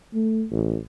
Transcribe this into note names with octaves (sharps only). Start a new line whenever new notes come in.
A3
A1